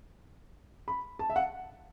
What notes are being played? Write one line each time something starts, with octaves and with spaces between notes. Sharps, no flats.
B5
A5
E5
F#5